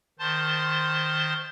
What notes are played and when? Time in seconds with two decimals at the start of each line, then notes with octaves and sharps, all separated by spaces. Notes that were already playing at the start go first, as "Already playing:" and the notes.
0.19 D#3 C5 A5 C6 A6